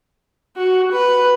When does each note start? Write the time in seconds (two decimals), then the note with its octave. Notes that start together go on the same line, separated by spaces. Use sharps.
0.57 F#4
0.92 B4